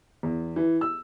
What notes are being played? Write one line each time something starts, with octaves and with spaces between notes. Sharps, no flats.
E2
E3
E6